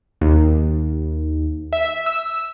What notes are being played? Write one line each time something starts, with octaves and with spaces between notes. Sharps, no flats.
D#2
E5
E6